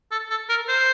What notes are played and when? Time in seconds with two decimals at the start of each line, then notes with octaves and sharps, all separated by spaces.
0.11 A4
0.30 A4
0.49 A#4
0.68 C5